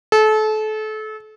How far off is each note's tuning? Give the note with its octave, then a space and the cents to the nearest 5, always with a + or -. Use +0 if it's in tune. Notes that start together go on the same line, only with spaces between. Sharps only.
A4 -30